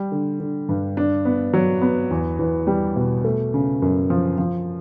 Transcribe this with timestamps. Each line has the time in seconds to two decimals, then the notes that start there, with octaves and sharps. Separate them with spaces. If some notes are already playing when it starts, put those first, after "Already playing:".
Already playing: G3
0.12 D3
0.40 D3
0.69 G2
0.97 D4
1.25 B3
1.53 F#3
1.82 B3
2.11 E2
2.39 E2
2.67 G3
2.96 B2
3.24 A3
3.54 C#3
3.82 F#2
4.10 F3
4.38 F3